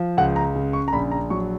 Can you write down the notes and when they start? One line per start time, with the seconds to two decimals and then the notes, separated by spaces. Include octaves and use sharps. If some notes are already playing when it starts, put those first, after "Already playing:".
Already playing: F3
0.18 C#2 F#5
0.36 A#5
0.56 C#3
0.73 C#6
0.88 A#5
0.93 A#1 B5
1.11 A#5
1.30 F#3 C#6